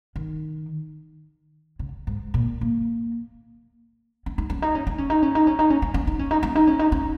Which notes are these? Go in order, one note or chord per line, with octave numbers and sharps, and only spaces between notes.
D#3
C#3
G#2
A#2
A#3
C#4
D#4
C#4
D#4
C#4
D#4
C#4
D#4
C#4
D#4
C#4
D#4
C#4
D#4
C#4
D#4
C#4
D#4
C#4
D#4
C#4
D#4
C#4